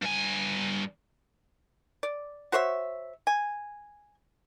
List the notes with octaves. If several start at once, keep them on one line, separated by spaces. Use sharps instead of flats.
G2 G#5
D5
F#4 C5 C#5 E5
G#5